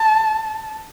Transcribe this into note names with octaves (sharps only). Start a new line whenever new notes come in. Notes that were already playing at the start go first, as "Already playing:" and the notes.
Already playing: A5